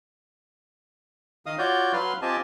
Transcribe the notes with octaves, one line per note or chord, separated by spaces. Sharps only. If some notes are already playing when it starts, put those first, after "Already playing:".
D#3 D#5 F5 D#6
F4 F#4 C#5 D5 G6
F#3 B4 F5 C6 F6
C4 F4 G4 D#5 G#5 A5